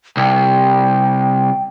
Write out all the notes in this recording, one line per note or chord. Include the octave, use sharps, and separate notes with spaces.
C2 G5